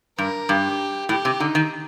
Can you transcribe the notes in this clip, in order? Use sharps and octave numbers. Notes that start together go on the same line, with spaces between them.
G2 A#4
G2 G4
A2 G4
C3
D3 D#4
D#3